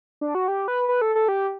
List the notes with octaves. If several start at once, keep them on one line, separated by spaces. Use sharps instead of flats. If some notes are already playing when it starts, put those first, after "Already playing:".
D4
F#4
G4
B4
B4
A4
A4
G4